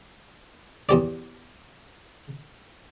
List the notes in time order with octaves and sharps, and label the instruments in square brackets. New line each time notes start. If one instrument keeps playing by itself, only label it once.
[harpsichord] E2 G4 D5